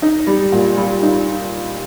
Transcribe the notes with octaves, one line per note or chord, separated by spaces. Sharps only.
D#4
G3
A#2
G3
D#4